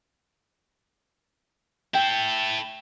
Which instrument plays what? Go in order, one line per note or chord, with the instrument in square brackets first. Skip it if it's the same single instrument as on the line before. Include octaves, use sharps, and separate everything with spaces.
[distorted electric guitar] E4 A4 [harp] G5 C7